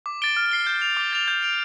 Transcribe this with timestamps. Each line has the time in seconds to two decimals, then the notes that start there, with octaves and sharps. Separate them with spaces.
0.06 D6
0.22 A6 D7 G7
0.37 F6
0.51 C7 G7
0.67 G6
0.82 F7
0.97 D6
1.13 A6 F7
1.28 G6
1.42 D7 F7